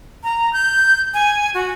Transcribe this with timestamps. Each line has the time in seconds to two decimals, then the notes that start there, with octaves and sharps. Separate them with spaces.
0.24 A#5
0.53 G6
1.14 G#5
1.54 F#4